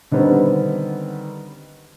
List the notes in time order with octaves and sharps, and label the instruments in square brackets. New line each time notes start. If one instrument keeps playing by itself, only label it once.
[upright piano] D3 D#3 G3 B3 C4